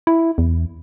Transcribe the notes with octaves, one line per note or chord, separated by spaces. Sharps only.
E4
E2